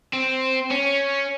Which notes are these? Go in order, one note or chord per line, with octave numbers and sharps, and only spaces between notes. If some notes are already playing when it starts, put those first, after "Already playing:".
C4
C#4